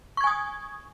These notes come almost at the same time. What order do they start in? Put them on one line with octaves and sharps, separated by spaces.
C#6 G#6 G#5 D#6